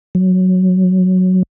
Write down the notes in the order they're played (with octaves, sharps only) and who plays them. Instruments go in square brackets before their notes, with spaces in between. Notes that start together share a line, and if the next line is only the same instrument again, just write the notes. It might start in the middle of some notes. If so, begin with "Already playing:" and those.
[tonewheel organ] F#3